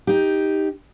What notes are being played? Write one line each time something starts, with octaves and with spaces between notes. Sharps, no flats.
D#4 G4